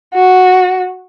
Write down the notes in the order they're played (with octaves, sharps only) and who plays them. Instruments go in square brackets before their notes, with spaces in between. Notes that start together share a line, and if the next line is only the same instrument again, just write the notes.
[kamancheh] F#4